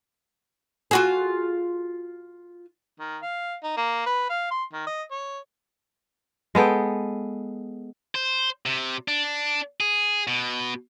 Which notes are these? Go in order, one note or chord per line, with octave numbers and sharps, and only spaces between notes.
F4 F#4 G#4
D#3
F5
D#4
A#3
B4
F5
C6
D#3
D#5
C#5
G#3 B3 A4 G5
C5
C3
D4
G#4
B2